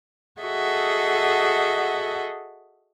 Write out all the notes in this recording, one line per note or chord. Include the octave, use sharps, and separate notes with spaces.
F#4 G#4 A4 D#5 E5 F#5